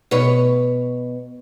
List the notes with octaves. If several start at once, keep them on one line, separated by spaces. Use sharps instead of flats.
B2 B4 C#5